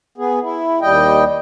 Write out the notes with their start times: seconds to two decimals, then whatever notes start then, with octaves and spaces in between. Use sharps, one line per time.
0.18 B3 G#4
0.42 E4
0.81 D#2 G3 D#5 G5